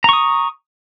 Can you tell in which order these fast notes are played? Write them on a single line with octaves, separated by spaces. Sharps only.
A#5 C#6 D#6